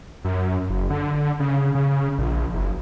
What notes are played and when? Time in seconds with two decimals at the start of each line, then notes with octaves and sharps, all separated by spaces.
0.25 F#2
0.69 F#1
0.90 D3
1.40 C#3
1.75 C#3
2.18 A#1
2.54 F#1